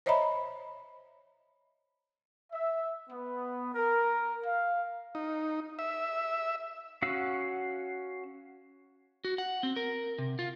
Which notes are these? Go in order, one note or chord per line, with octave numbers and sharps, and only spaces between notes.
C5 C#5 D#5 E5 A#5 B5
E5
B3
A#4
F5
D#4
E5
C#4 F#4 F5 F#5 E6
F#4
F#5
C4
A#4
C3
F4